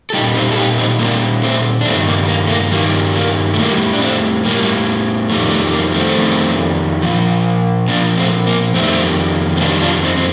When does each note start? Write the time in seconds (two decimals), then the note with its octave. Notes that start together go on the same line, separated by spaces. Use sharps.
0.10 A4
0.14 G3 D#4 G4
0.17 A#2
0.35 C4 D#4
0.52 A4
0.58 D#4 G4
0.78 C4 D#4
1.00 A#2 G3 A#3 D4
1.43 A3 C4
1.81 D4
1.86 G2 D#3 G3 A3 C4
2.07 A#3
2.29 A#3
2.47 A3
2.51 A#3
2.71 G2 D#3 G3 A#3
3.16 A#3
3.54 A3
3.58 A2 G3 A#3
3.93 D4
4.01 A3 C4
4.45 A2 G3 A#3
5.30 F2 D#3 G3 A3
5.51 A3
5.73 A#3
5.94 A3 C4
6.17 F2 D#3 G3
7.02 A#2 F3
7.88 A#2 F3 A#3 D4
8.17 A3 C4
8.47 A#3
8.74 F2 D#3 G3 A3 C4
9.57 C4
9.60 F2 D#3 G3 A#3 D4
9.82 D4 F4
10.04 C4 D#4
10.17 C4